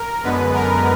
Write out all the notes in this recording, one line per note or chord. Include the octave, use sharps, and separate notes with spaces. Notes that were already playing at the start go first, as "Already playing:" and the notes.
Already playing: A#4
F#2 D3 G#3 B3 B4
A#4